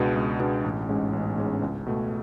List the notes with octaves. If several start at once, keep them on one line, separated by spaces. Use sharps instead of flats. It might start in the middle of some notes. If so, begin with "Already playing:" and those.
Already playing: C#2 B2 G#3 B3 D4
C#2
B2 G#3 B3 D4
A1
G#2 G#3 C#4
A1
G#2 G#3 C#4
C#2
B2 A3